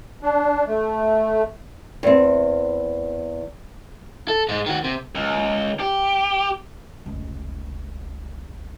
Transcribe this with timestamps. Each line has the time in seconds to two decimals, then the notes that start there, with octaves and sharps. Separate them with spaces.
0.22 D4
0.67 A3
2.03 E2 C4
4.28 A4
4.49 G#2 G#3
4.66 D#3 F#4
4.84 C3
5.15 C#2
5.80 G4
7.06 F1 C#2